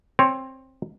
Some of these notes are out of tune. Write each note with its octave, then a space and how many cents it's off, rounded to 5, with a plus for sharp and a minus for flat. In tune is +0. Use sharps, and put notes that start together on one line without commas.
C4 +15 C#5 +10